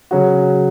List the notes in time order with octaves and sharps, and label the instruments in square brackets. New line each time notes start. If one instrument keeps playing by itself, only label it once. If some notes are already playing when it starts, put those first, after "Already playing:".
[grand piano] C#3 F#3 C#4 F#4